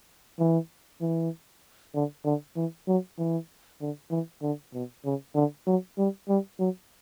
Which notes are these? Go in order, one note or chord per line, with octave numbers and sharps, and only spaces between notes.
E3
E3
D3
D3
E3
F#3
E3
D3
E3
D3
B2
C#3
D3
F#3
G3
G3
F#3